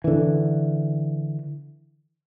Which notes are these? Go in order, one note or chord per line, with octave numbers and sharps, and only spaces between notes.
D3 E3